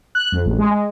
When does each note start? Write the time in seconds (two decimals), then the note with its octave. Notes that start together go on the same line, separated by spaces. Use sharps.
0.15 F#6
0.32 F2
0.46 A1
0.58 G#3
0.71 G#3